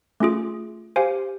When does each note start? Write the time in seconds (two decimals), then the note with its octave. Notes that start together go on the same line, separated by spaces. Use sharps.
0.20 A3 C#4 F4 G#4
0.96 G4 C5 F5 G#5